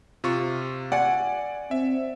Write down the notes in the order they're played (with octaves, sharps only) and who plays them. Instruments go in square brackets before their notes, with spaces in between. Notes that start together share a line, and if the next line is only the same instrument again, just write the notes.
[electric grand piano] C3 F4 C#6
[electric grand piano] D5 G#5 [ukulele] F#5
[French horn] C4 [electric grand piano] E5